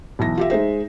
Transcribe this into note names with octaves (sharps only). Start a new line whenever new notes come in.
B1 E3 A#6
F4 G4 E5
G#3 D#4 C5 E5